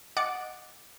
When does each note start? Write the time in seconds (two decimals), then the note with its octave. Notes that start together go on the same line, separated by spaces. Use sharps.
0.17 D#5 F#5 D6 A6 C#7